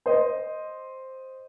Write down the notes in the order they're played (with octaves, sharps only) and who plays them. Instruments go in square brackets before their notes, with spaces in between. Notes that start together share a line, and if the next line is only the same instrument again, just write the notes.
[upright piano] C5 D#5